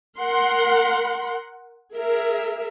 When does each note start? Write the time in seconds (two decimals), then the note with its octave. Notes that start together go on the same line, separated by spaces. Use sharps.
0.18 A#4 F#5 C6
1.96 G#4 A#4 E5